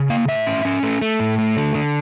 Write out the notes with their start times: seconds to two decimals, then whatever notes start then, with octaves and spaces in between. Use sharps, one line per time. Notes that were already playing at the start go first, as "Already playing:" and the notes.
Already playing: C#3
0.10 A#3 F5
0.28 A2 E5
0.47 C#4
0.65 C#4
0.83 A3
1.01 A3
1.20 A2
1.38 A3
1.57 D3
1.75 D3